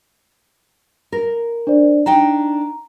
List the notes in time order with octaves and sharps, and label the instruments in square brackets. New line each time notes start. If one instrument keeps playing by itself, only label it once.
[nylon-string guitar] A#4
[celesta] D4 C5 D5
[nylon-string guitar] D4 D#4 G5 [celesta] A#5